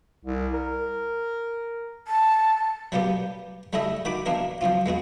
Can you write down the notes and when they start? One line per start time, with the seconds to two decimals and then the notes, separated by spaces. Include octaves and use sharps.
0.25 C2
0.54 A#4
2.08 A5
2.92 F#3 G3 A#3 B3 G4
3.73 G3 A3 E4 G#4 D#5 E5
4.05 D#3 F#4 B5 D6
4.26 B2 E3 A#3 D4 A#4
4.61 F3 F#3 C4 F4
4.86 G#3 B3 F#4 G#4